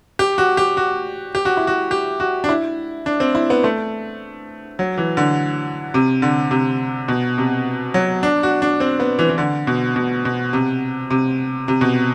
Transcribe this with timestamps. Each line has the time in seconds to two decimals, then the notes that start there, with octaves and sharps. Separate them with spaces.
0.19 G4
0.38 F#4
0.57 G4
0.77 F#4
1.35 G4
1.45 F#4
1.57 E4
1.67 F#4
1.91 G4
2.20 F#4
2.44 D4
2.49 E4
3.06 D4
3.20 C4
3.35 E4
3.50 B3
3.64 A3
4.79 F#3
4.98 E3
5.17 D3
5.94 C3
6.22 D3
6.51 C3
7.08 B2
7.38 C3
7.94 F#3
8.23 D4
8.43 F#4
8.62 D4
8.80 C4
9.00 B3
9.19 E3
9.29 E3
9.38 D3
9.67 B2
9.96 B2
10.25 B2
10.53 C3
11.10 C3
11.68 C3
11.81 B2